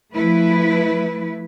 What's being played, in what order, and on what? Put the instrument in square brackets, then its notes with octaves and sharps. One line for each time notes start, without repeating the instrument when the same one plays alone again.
[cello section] F3 A3 E4 B4